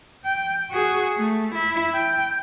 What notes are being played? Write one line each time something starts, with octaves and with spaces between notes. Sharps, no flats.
G5
F#4 G#4
A3
E4
G5